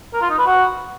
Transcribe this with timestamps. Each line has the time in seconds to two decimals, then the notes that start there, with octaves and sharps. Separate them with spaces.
0.14 A#4
0.22 F4
0.30 D#4
0.38 B4
0.46 F#4